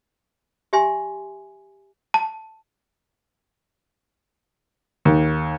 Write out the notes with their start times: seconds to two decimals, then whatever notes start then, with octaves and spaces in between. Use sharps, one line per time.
0.73 G4 E5 G#5 C6
2.14 A5
5.05 D#2